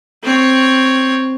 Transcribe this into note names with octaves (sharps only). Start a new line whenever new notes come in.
C4 C#5